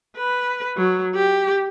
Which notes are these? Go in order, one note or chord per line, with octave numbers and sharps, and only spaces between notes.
B4
F#3
G4